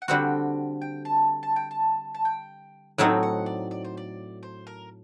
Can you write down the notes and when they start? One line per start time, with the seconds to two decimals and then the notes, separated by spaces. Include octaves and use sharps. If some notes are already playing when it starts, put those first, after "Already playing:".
0.02 F#5
0.08 D3 G3 C4 F#4 G5
0.82 G5
1.05 A5
1.43 A5
1.56 G5
1.71 A5
2.15 A5
2.25 G5
2.98 A2 F#3 A3 C4 D#4 G5
3.23 F#5
3.46 D5
3.71 D5
3.85 C5
3.97 D5
4.43 C5
4.67 A#4